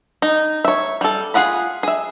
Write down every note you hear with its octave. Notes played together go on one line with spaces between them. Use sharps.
D#4
C#5 E5
G3 A4
F4 G#4 F#5 B5
G#4 E5